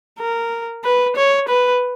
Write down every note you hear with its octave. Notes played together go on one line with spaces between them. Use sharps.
A#4
B4
C#5
B4